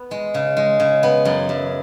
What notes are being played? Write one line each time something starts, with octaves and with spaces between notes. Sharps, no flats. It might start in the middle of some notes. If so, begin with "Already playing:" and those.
Already playing: B3
G#3
C#3
G#3
C#3
B3
F#2
F#2